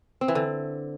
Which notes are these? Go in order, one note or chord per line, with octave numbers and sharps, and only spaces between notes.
C4
E3
D3